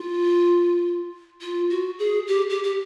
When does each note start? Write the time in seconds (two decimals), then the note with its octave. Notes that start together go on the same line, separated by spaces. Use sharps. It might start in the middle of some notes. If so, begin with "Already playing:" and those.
Already playing: F4
1.41 F4
1.70 F#4
1.99 G#4
2.28 G4
2.50 G4
2.64 G4